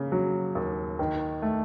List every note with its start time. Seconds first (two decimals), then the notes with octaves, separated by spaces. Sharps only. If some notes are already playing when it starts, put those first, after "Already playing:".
Already playing: C#3 A#3
0.12 F#3
0.55 D#2
0.99 D#3
1.42 A3